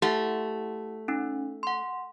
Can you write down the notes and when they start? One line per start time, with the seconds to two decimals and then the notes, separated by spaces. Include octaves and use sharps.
0.02 A3 E4 G4 F#5
1.08 C#4 D#4
1.63 F#5 C6